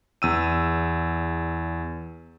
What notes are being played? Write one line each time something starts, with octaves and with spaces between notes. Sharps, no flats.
E2 E6 D#7